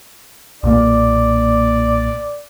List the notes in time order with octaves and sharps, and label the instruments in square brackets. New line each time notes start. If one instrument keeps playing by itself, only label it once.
[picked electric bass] B1 A#2 A#3 [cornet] D5